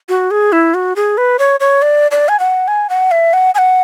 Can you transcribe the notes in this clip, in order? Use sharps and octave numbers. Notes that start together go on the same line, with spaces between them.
F#4
G#4
E4
F#4
G#4
B4
C#5
C#5
D5
D5
G#5
F#5
G#5
F#5
E5
F#5
G#5
F#5